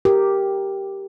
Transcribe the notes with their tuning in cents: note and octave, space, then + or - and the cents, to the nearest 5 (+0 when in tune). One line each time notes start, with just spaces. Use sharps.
G4 +0 A#4 +0